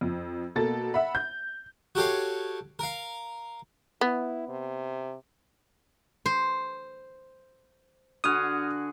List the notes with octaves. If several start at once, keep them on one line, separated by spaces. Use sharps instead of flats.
F2
B2 A#3 A4 A6
E5 F#5 B5
G6
F#4 G4 A4 C#5 F5
A#4 F5
B3 E4
C3
C5
D3 F#4 G#4 D#6 F6